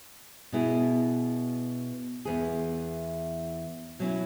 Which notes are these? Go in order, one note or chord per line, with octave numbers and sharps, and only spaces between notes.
B2 B3 E4 G#4
E2 E3 B3 G#4
B2 F#3 C#4 E4